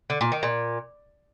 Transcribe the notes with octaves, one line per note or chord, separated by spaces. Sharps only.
D3
A#2
D#3
A#2